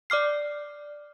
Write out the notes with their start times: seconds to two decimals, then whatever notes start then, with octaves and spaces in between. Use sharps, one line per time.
0.10 D5 D6 F6 C7